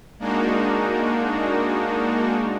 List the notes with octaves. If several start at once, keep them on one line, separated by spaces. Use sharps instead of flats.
G#3 A#3 D4 D#4 F#4